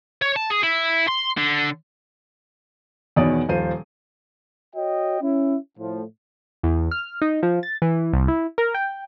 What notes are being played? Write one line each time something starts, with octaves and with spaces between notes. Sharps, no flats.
C#5
A5
G#4
E4
C6
D3
E2 B2 D#3 C#5 D5 D#6
D#1 F3 C5 D#7
F#4 C#5 D#5 G5
C#4 E4
A2 F3
E2
F6
D#4
F3
A6
E3
C2
E4
A#4
G5